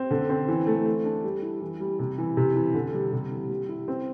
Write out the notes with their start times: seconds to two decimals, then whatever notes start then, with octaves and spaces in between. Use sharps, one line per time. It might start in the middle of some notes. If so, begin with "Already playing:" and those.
Already playing: C4
0.11 D3
0.29 C4
0.48 E3
0.67 A3
0.86 A3
1.05 D4
1.23 G3
1.42 E4
1.61 E3
1.80 G3
1.99 C3
2.18 E3
2.37 C3
2.56 E3
2.74 D3
2.94 G3
3.12 C3
3.31 E3
3.50 G3
3.69 E4
3.88 C4